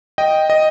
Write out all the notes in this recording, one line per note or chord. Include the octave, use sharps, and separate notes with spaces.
D#5 G5
D#5